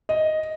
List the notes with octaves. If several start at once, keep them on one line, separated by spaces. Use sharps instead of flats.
D#5